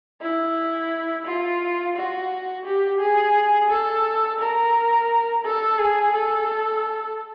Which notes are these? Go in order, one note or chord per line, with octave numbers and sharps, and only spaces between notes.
E4
F4
F#4
G4
G#4
A4
A#4
A4
G#4
A4